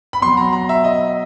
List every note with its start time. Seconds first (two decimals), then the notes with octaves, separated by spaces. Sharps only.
0.13 B5
0.21 B2 F#3 C6
0.37 A#5
0.53 A#5
0.69 E5
0.84 D#5